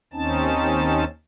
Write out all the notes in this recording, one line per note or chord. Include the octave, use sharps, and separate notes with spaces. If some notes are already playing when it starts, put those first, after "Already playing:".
D#2 C4 C#4 D#4 A5